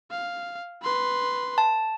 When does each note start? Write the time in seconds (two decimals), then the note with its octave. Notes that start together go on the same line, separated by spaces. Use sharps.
0.11 F5
0.83 B4 C6
1.58 A5